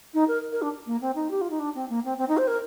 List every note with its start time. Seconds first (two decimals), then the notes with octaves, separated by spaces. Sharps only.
0.14 D#4
0.28 A#4
0.52 A#4
0.62 D4
0.86 A#3
1.01 C4
1.15 D#4
1.31 G4
1.41 F4
1.50 D#4
1.59 D4
1.75 C4
1.89 A#3
2.04 C4
2.18 C4
2.28 D#4
2.37 C5
2.47 A#4